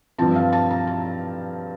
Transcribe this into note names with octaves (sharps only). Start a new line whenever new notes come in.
G2 F3 C4 A5
F5
A5
A#5
A5